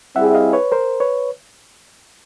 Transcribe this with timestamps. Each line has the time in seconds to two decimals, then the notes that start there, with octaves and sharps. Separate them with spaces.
0.15 G3 C4 E4 G#4 E5 F#5
0.34 D#5 F5
0.53 B4 C#5
0.72 A#4 C5
1.00 B4 C#5